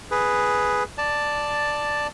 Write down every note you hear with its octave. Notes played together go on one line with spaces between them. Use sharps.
G#4 B4
D5 A5